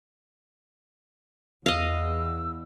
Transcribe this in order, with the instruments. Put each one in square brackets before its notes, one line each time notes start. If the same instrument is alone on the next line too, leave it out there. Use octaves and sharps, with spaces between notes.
[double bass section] E2 [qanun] D#5 F5 [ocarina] E6